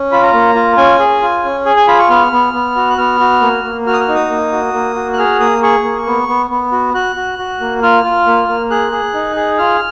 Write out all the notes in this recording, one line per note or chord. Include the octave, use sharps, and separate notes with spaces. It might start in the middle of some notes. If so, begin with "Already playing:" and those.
Already playing: C#4
F4 B5
A#5
A#3
F4
C#4 G#5
G#4
F4
C#4
G#4 G#5
G#5
F4 B5
C#6
B3 F6
B3
B3
F#4
F#6
B3 F6
F#4
A#3
A#3
F#4 F6
D#6
F6
D#4
D#6
A#3
F#4
A#3
F#4
F#6
G#4 F6
A#3 D#6
G#4 C#6
A#3
B3
B3
B3
F#4
F#4 F#6
F#4
F#4
A#3
F4 F6
F4
A#3
A#3
G#4 F#6
G#4
D#4
G#4
F4 F6